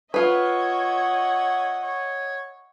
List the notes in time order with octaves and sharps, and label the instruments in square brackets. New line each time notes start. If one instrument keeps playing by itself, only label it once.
[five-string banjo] F4 B4 [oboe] C#5 [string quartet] D#5 E5 F#5
[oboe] C#5